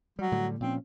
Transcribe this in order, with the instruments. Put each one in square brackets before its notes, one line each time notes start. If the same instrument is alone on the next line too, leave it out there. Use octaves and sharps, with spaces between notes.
[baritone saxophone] F#3 [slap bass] G3
[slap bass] A2 D3 G3
[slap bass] A#2 F3 C#4 [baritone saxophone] C4